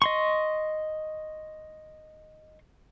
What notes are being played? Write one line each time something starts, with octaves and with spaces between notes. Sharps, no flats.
D#5 C6 C#6